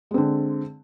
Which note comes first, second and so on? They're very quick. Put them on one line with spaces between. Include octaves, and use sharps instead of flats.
G#3 C4 D3